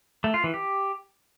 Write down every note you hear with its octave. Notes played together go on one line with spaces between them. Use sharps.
A3
F4
E3
G4